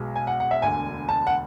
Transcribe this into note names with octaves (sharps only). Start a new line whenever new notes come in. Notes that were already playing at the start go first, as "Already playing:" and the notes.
Already playing: B1 B2 G#3
G#5
F#5
F#5
E5
E1 D2 D3 G#5
A5
F#5